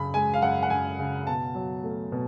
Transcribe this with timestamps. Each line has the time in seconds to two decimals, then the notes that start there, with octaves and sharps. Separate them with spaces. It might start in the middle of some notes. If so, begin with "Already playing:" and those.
Already playing: F#2 C#3 B5
0.14 G#3 G#5
0.34 F5
0.42 F#2 F#5
0.63 F#5
0.70 F#2 G#5
0.99 C#3
1.27 B2 A5
1.55 F#3
1.84 A3
2.12 B2